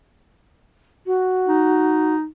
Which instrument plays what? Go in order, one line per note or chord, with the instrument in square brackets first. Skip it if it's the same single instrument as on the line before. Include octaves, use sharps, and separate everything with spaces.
[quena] F#4
[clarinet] D#4